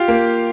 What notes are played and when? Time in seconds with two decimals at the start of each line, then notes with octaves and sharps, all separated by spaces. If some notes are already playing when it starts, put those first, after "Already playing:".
Already playing: F4 G4
0.08 A#3